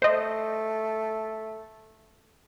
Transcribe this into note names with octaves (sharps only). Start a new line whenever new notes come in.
A3 C5 D#5